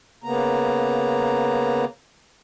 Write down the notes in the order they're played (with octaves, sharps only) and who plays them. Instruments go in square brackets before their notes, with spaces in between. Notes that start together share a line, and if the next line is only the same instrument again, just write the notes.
[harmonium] C#3 A#3 B3 A#5